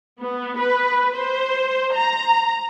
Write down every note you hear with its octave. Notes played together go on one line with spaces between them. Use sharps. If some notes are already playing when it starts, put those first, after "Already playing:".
B3
B4
C5
A#5